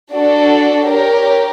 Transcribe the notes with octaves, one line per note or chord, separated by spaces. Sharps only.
D4 F#4 A4 D5
G4 A#4 C#5